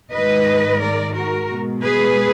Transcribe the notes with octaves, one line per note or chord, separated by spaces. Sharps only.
G#2 D#3 G#3 B4 D#5
A#4 D5
F#4 A#4
B2 G#3
G#4 B4